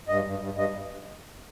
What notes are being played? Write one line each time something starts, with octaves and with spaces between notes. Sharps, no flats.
G2 D#5
G2
G2
G2 D#5